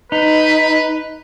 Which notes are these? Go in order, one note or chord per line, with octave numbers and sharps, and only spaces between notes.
D#4 B4